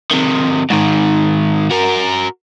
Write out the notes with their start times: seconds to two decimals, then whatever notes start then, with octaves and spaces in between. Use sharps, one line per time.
0.11 C3 D#3
0.70 G#2 D#3
1.70 F#4 A#4